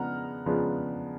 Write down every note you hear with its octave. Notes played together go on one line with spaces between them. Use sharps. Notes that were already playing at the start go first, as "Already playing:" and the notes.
Already playing: C#3 F3 G#3 B3 D4 F#5 A#5 F6
C#3 F3 G#3 B3 D4